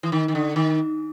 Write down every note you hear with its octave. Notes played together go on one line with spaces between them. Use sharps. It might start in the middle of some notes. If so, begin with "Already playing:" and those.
E3
D#3
D#3
D3
D#3